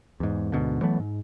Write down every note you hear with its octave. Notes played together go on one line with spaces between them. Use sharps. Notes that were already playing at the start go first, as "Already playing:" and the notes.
E2 G#2
D2 G#2 B2 D3
E3 F#3 A3 B3
G#2